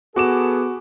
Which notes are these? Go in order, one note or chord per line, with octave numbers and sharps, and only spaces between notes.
B3 F#4 G#4 A4 D6 E7